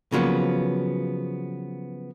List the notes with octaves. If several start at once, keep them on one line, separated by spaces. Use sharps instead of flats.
C#3 F3 F#3 A#3 B3